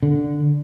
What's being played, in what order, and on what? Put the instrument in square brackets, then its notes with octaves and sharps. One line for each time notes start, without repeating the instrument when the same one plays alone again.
[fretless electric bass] D3